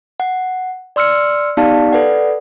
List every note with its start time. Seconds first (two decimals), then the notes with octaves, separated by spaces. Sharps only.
0.20 F#5
0.96 D5 C6 E6 F6 C#7
1.57 B3 D#4 G4 D5 F5 A5
1.93 A4 B4 D5 F#5